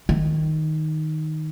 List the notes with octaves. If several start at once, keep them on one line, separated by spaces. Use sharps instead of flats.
D#3